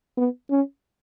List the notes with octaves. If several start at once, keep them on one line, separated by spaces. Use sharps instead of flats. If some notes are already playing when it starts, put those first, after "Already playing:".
B3
C#4